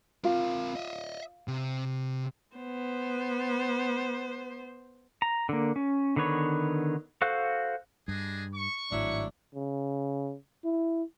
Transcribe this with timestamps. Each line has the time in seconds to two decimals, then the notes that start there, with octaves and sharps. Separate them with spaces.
0.24 C4 F4 A#4
0.75 D#5 E5
1.48 C3
2.57 B3 C5
5.22 A#5
5.49 D3 A#3
5.76 C#4
6.16 D3 D#3 B3 B4 C#5
7.22 F#4 A4 C5 F5 F#6
8.08 G2 D4 G#4 D#5
8.55 C#6
8.92 G#1 A2 F#3 D4 E4
9.55 C#3
10.64 E4